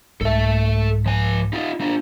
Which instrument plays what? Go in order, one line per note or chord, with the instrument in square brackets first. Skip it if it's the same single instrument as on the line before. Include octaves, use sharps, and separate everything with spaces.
[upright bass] C2 G#2 [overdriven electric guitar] A4 E5
[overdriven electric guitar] F3 G#5
D#4 F4
D4 F4